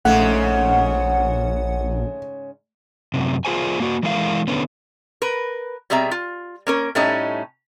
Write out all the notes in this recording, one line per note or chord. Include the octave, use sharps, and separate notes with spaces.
A#1 G#2 C#3 A3 C#4 F#5
F#2 C3
F4 G#4 C5 G#5
A#3 F#4
E3 G#3 E4 A#4 F5
D3 B3 C#4
A#4 B4
B2 G3 C4 G#4 E5 A#5
F4
A#3 C#4 A#4
A2 G3 A3 C#4 D#4